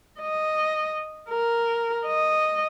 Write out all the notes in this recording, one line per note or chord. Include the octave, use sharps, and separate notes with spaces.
D#5
A#4
D#5